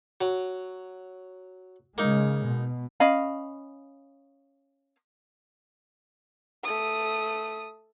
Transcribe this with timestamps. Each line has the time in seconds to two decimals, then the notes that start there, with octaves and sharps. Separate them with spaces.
0.21 F#3
1.98 C#3 G#3 A#3 D#4
2.45 B2
3.00 C#4 D#5 F5 B5
6.64 A3 D#6